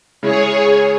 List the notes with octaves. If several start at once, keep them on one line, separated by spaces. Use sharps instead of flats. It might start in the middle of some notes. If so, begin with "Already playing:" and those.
C#3 G#3 E4 G#4 C#5